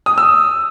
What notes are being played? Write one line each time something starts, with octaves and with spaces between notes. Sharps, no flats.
D#6
E6